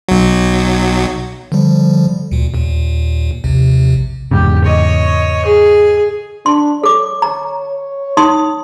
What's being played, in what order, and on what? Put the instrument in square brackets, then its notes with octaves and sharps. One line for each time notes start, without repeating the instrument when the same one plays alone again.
[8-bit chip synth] B1 F#3
D3 F3 G3
D2 A#2
D#2 A#2
A#1 D#2 C3
[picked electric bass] E2 G#2 C#3 [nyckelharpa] G4
[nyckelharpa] C#5 D#5
G#4
[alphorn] D4 [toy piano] C6
[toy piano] A4 D6 [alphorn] C#5
[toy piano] A#5
D#4 C6 D#6